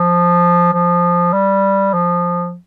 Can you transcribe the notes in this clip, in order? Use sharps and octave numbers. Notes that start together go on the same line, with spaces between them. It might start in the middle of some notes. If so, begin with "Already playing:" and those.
Already playing: F3
F3
G3
F3